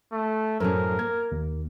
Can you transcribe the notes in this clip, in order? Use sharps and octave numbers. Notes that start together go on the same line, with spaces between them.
A3
F#2 A2 F#3 C#4 A4 A#4 C5
A#3 G#6
D#2